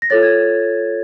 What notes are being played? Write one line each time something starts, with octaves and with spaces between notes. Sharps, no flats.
A#6
F4 A4 C#5 A6
G#6